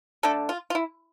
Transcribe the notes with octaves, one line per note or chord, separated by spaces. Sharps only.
D3 A3 D4 A4
F4
F4
E4